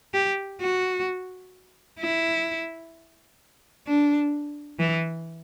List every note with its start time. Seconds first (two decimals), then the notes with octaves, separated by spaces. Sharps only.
0.14 G4
0.61 F#4
2.00 E4
3.87 D4
4.79 E3